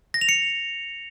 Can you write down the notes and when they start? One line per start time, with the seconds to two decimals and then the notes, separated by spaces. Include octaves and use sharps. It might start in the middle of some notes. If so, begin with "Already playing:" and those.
0.14 A#6
0.21 F7
0.29 C#7